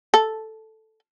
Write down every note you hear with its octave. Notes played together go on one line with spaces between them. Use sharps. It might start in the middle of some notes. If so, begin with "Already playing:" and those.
A4